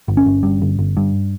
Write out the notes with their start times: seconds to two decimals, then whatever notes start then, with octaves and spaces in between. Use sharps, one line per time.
0.08 G1
0.17 C#4
0.26 G1
0.43 G2
0.62 G1
0.79 G1
0.97 G2